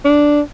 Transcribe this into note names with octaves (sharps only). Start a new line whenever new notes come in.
D4